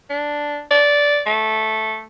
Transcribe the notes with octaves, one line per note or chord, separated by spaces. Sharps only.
D4
D5
A3